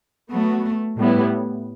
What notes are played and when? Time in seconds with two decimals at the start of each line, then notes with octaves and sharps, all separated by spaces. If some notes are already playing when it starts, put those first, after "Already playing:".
0.31 F#3 A3 B3 F#4
0.97 A2 G3 B3 E4